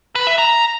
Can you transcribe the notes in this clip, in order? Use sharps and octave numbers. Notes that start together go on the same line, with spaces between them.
B4
E5
A#5